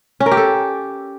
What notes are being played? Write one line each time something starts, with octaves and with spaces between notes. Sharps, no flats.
C#4
A#4
G4
A4